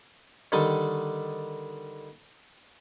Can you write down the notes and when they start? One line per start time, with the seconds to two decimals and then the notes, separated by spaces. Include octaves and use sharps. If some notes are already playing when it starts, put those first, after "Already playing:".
0.52 D3 D#3 G3 A5